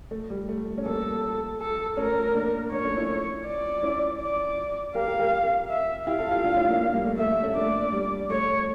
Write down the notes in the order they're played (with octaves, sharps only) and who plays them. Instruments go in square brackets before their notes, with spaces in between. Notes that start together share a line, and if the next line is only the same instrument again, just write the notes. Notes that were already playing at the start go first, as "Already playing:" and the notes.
[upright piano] A3
G3
A3
C#4
[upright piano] G3 A#3 [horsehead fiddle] A4
[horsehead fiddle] A4
[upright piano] A3 C#4 [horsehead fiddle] A#4
[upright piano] A#3 D4
[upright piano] A#3 D4 [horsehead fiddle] C#5
[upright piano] A3 C#4
C#4 E4
[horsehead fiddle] D5
[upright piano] C#4 E4
[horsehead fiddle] D5
[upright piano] G4 A#4 [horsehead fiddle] F5
[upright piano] G4 A#4
G4 A#4
[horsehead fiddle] E5
[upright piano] E4 G4 [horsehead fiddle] F5
[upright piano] F4 A4
E4 G4
D4 F4
C#4 E4
A#3 D4
A#3 D4
G3 A#3
A3
[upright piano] A3 [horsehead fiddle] E5
[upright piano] G3
A3
A3 C#4
[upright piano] A#3 D4 [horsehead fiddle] D5
[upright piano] G3
[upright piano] A3 [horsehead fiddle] C#5